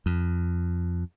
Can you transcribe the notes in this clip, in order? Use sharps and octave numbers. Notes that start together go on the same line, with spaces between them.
F2